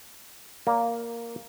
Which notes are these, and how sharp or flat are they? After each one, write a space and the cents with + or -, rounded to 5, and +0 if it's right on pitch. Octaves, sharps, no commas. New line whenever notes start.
A#3 +0 D5 -25